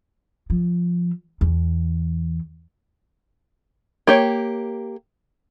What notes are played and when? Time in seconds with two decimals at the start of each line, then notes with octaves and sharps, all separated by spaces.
0.50 F3
1.41 E2
4.07 A#3 G4 C#5